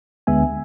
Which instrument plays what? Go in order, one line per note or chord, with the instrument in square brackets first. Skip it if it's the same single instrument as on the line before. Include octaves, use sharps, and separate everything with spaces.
[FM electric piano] D2 D3 G#3 B3 E5 G#5